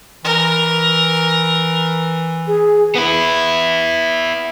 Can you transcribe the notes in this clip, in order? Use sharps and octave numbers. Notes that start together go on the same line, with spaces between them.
E3 A#4
G#4
B3 E4